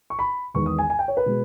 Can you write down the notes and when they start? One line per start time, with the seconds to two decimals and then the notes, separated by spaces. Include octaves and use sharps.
0.10 C#6
0.19 B5
0.54 E2 D#3 G#3 B3 C#6
0.66 D#6
0.78 G#5
0.90 G#5
0.99 G5
1.08 C#5
1.17 B4
1.26 B2 G#3